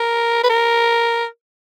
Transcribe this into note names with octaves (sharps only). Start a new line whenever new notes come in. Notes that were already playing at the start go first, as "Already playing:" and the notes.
Already playing: A#4
B4
A#4